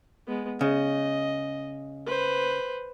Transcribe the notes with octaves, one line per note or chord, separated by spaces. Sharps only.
G#3 B3
C#3 D#5
B4 C5